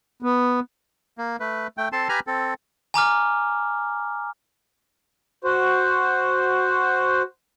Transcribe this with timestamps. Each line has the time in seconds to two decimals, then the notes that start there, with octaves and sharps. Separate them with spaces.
0.22 B3
1.18 A#3
1.40 A3 B4
1.77 A3 G5
1.92 C4 A4 A5 C6
2.09 G4 B4 G#5 A#5 B5 F6
2.27 C4 A4
2.94 G#5 A#5 D6 F6
5.44 F#4 C5